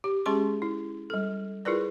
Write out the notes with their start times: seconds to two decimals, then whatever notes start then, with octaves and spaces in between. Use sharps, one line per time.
0.04 G4
0.26 G#3 C#4 G4 G#4 C6 C#6
0.62 E4
1.10 G3 A4
1.65 E4 F4 G#4 A#4 B4 D5